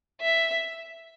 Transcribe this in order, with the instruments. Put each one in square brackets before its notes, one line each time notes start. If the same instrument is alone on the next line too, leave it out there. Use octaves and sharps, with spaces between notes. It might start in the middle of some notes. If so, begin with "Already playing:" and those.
[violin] E5